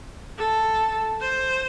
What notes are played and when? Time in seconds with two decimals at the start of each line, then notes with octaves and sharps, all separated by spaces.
0.38 A4
1.20 C5